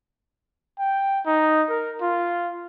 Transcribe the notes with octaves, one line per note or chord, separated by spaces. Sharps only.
G5
D#4
A#4
F4